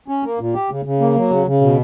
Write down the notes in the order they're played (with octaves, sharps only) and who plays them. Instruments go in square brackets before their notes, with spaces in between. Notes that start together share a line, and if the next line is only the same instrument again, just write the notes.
[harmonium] C#4
A#3
A#2
G4
C#3
C#3
A#3
F#3
C#3
C#3
B2